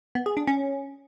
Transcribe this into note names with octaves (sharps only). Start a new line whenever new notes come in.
B3
G#4
D4
C#4